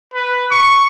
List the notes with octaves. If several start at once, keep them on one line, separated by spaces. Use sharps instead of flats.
B4
C#6